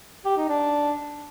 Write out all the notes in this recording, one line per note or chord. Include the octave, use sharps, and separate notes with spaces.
G4
D#4
D4